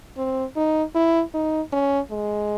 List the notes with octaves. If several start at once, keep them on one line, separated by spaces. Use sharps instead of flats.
C4
D#4
E4
D#4
C#4
G#3